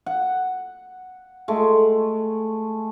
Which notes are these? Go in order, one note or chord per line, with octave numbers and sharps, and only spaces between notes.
F#5
G#3 A3